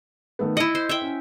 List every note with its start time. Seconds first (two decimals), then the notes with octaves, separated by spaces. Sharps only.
0.39 D#3 A3 B3
0.57 E4 D#5 B5 C#7
0.75 C5
0.89 E5 G5
1.02 C#4